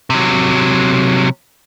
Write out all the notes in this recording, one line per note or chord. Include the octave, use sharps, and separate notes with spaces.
C3 F#3